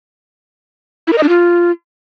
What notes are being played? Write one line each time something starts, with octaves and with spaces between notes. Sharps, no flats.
E4
A#4
D#5
D4
F4